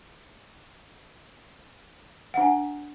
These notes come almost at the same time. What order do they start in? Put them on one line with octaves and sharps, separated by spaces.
F#5 D4 G#5